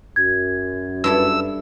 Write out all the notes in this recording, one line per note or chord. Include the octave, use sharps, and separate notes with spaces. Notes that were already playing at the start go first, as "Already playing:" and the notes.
F#2 G#6
G2 E4 A4 E6